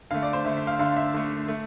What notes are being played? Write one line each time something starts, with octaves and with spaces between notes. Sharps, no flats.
D3 A3 F5
D5
C5
D3 A3 E5
E5
F5
D3 A3 F5
E5
D3 A3
A3